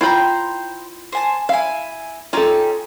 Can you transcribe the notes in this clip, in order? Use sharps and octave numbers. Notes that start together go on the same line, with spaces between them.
E4 F4 C5 G5 A#5 B5
C5 G#5 A5
E4 F5 G#5
C#4 D#4 F4 G4 A4